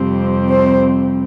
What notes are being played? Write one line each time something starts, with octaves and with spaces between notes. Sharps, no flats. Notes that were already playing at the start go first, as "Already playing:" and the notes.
Already playing: F2 C3 G3 C4
C5